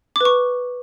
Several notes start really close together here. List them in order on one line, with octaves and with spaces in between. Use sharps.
D6 B4 C#6